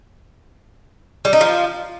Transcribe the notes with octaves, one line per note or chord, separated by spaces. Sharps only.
G3
D#4
F3